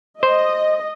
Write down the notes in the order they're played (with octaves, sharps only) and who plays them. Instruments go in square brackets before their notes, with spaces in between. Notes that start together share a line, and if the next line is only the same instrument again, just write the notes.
[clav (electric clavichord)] C5 [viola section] D#5